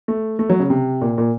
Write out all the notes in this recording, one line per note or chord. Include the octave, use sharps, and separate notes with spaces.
A3
A3
F#3
C#3
C3
A#2
A#2